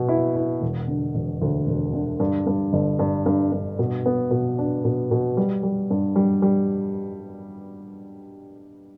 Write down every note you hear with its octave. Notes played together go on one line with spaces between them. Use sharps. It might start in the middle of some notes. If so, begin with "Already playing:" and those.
Already playing: B2 B3
E4
E4
E1
D3
E1
D2
E1
D3
G2
G2
G1
G2
G2
G2
B2
B3
B2
D4
B2
B2
G3
G3
G2
G3
G3